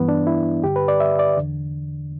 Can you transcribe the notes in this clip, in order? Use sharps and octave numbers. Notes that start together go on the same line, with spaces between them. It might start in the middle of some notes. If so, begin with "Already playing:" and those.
Already playing: G2 E3 B3
D4
E4
G2 D3 G4
B4
D5
E5
D5
E2 D3